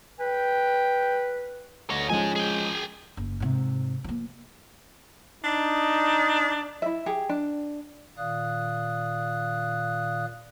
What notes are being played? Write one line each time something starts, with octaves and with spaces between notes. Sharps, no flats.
B4 G5
D2 C#5 D#5
F3 G#3 C#4 D#4 G#5
G#4 G5
F#1
G#2 C3
F3 A#3
D4 D#4
E4 E5
G4 G#4
D4
A#2 D#3 D5 F5 D#6 F#6